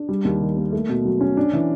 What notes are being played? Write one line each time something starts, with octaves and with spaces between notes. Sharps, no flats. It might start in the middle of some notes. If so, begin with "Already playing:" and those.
Already playing: D4
G3
D#2
D#3
A#3
A3
B2
F#3
C#4
D4
E3